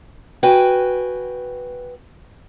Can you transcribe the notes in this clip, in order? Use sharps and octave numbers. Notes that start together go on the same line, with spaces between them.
F#4 B4 G5 G#5